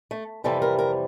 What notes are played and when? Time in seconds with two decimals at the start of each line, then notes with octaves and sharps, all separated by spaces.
0.11 A3
0.44 F2 C3 E3 G3 A4
0.62 A#4
0.79 A#4